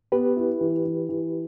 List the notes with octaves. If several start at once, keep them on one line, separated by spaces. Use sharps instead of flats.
B3 G4 B4
E4
E3
E3
E3